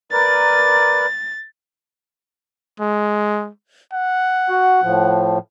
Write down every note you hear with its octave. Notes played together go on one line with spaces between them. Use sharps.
A#4 B4 D5 A6
G#3
F#5
F#4
A2 F3